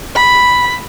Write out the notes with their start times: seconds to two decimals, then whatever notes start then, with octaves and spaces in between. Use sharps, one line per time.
0.15 B5